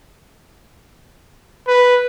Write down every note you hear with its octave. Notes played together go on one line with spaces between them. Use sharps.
B4